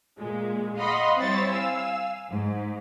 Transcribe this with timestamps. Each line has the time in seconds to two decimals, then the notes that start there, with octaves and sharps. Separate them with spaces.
0.17 A#2 G#3
0.77 D#5 F5 F#5 B5 C6
1.18 G3 C4 E4 C5 C#5 A6
1.49 F5 G#5 E6
2.30 G#2